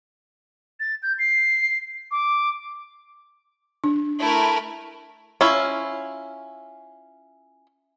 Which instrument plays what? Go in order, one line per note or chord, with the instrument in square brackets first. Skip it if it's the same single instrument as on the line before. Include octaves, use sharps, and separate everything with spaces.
[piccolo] A6
G6
C7
D6
[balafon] D4
[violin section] A3 E4 A#4
[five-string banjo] C#4 E4 F4